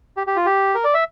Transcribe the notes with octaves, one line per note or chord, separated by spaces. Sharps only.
G4
G4
F4
G4
A#4
D5
E5